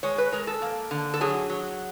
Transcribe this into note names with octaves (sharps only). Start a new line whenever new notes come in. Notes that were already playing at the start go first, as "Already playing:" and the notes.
G#3 C#5
B4
G#3 A#4
A4
A#3
D3
A4
F#3 G#4
F#3